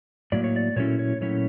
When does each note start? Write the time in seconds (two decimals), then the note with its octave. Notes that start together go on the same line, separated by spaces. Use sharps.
0.32 A2 F#3 A#3 D5
0.44 C#5
0.56 D5
0.76 A#2 F#3 A3 C#4 E4 C#5
0.99 C#5
1.21 A#2 F#3 A3 C#4 E4 C#5